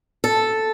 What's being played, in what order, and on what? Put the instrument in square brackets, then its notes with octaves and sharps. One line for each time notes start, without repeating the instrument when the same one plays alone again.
[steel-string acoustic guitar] A4